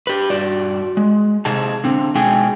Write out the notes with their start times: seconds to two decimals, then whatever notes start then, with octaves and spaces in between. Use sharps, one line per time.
0.07 G4 B4
0.30 G2 F#4 D5
0.97 G#3
1.45 C3 D#4 G#4 A5
1.84 D3 C4
2.15 B2 G#3 D#4 G#4 G5 G#5